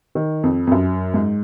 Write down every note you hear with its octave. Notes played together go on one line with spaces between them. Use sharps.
D#3
F2
F2
F#2
G#2